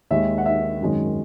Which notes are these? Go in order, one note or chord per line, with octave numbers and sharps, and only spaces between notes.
D#2 D#3 G#3 E5
F#5
E5
G#1 F#2 D#3 G#3